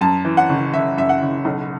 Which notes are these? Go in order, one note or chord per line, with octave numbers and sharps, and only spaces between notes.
F#2 A5
E3
F#5
F#1
F#1 E5
F#2 E5
F#5
F#1
B1